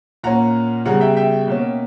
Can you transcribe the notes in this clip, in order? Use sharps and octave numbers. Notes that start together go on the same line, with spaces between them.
A#2 A#3 C#4 F#5 A#5
C#3 G3 B3 F#5 A#5
E5 G5
E5 G5
B2 A#3 C#4